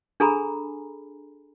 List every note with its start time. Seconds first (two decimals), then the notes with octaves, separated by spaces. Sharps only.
0.20 D4 G#4 A4 G#5 A#5 B5